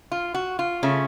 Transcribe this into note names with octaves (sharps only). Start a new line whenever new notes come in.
F4
F#4
F4
C#3 A3 C#4